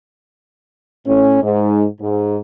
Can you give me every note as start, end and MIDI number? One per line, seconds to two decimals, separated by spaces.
1.05 1.39 45
1.05 1.39 61
1.41 1.84 44
1.99 2.37 44